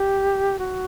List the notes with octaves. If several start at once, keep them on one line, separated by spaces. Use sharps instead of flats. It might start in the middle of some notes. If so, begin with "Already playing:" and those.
Already playing: G4
F#4